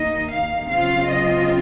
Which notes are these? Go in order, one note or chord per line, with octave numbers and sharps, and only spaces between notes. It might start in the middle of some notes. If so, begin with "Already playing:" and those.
Already playing: D#2 D#3 A#3 D#4 D#5
F5
C#3 F#3 C4 F4 F5
D#5